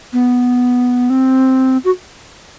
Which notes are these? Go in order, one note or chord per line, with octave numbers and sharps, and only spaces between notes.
B3
C4
F#4